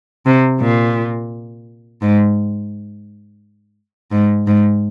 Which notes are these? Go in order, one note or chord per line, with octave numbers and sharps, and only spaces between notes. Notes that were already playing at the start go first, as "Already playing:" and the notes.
C3
A#2
G#2
G#2
G#2